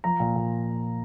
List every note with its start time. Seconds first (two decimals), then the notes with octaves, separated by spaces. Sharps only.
0.04 F3 A#5
0.20 A#2
0.36 A#2